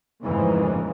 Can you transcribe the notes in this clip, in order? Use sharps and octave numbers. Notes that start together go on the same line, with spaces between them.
A1 F2 G#2 C#3 E3 A#3